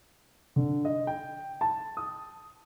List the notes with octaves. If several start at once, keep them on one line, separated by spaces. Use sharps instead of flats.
D3
D#5
G5
A5
D#6